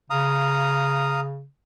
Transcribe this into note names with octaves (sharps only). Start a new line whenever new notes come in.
C#3 F5 A#5 D#6